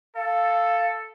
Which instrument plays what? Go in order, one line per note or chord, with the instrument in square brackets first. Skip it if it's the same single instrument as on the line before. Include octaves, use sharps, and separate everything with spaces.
[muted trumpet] A4 [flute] F5